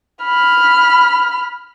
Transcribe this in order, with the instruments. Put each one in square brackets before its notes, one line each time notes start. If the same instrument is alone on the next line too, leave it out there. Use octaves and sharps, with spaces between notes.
[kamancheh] B5 F6